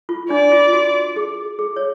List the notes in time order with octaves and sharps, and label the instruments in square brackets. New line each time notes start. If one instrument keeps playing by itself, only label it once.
[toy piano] F4
[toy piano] D4 [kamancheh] D5
[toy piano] F4
F#4
G#4
G#4
C#5